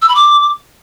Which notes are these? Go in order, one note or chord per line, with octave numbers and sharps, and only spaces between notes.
E6
B5
D6